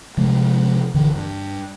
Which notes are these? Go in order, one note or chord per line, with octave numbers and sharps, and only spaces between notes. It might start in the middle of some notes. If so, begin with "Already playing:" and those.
C3 F3 G#3 A3
D#1 D3 E3
G2